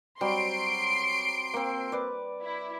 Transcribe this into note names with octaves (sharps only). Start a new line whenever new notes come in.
F#3 G3 C4 C6 C7 D7
A#3 C4
B4 D5
E4